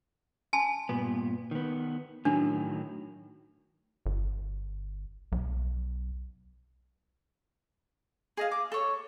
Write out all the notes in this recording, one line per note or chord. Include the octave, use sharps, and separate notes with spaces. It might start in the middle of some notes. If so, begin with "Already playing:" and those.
G#5 A5 C6
G2 A#2 B3
D#3 B3
A2 D#3 F#3 D4
G1
B1
G#4 D#5 F5
D6
A4 C#5